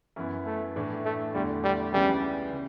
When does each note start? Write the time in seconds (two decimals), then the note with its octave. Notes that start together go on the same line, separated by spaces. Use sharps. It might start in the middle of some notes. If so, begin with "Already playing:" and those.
0.16 F#2 E3 B3 E4
0.46 A3
0.76 A2 E3 A3 D4
1.05 A3
1.34 E2 D3 G3 A3 E4
1.64 G3
1.93 C#2 C#3 E3 G3 B3
2.52 C#3